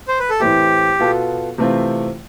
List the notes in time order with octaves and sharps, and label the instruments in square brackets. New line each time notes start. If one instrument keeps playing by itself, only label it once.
[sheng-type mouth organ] C5
B4
A4
[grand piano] A2 E3 A3 C4 E4 [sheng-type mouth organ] G4
[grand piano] B2 B3 F4 A4
C3 E3 A3 C4 F4